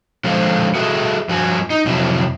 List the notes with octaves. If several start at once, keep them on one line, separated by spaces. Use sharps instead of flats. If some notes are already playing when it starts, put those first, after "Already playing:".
D3 F3 G#3 A4 C5 F5
F#4 G#4 A4 E5
G2 F3 F4 F#4 G#5
D#4
F2 C3 F#3 E4